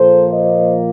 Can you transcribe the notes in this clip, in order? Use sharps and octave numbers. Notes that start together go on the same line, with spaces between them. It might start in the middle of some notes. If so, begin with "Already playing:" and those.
Already playing: A#2 F3 A#3 A4 C5
C5 D#5